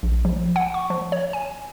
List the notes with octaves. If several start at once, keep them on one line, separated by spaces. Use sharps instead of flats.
A#1
F3
F#5
C#6
F3
C#5
G#5